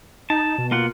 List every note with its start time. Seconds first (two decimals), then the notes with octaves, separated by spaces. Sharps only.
0.30 D#4 A5
0.58 B2
0.71 A#3 F4 F#5